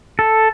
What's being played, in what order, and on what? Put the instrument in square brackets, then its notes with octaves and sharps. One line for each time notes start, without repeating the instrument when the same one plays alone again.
[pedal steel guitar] A4